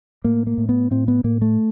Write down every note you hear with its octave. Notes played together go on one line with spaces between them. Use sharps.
A2 A#3
A#3
A2
B3
A2 C4
B3
A2 A#3
A3